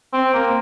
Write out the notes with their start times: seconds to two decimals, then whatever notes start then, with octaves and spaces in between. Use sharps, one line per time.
0.13 C4
0.34 A#3